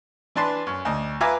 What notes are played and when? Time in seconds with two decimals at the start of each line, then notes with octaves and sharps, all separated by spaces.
0.35 E3 D4 B4 A5 C6
0.66 F#2
0.85 D2 D#5
1.20 F4 B4 E5 G#5 A#5 D6